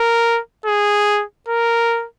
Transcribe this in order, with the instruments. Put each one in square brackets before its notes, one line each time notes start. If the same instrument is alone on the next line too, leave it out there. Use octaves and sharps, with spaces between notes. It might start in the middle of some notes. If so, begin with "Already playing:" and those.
Already playing: [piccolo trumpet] A#4
G#4
A#4